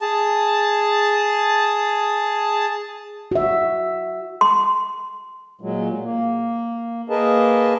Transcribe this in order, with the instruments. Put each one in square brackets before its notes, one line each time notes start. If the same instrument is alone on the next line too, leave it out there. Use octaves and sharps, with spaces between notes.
[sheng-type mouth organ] G#4 A5
[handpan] F#4 E5
[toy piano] C6
[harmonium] A#2 F#3 G#3
A#3
A#3 G#4 A#4 B4 D#5 A5